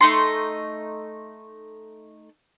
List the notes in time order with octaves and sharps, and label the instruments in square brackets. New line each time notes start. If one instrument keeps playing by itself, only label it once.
[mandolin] A3 D#4 C6